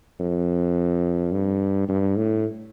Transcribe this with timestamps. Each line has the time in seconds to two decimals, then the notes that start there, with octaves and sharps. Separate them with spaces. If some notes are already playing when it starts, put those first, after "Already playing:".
0.20 F2
1.32 G2
1.88 G2
2.16 A2